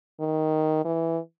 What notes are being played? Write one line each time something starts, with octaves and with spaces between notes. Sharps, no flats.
D#3
E3